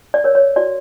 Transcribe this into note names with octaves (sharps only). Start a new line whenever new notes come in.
D5
A#4 C#5
C#5
F#4 D5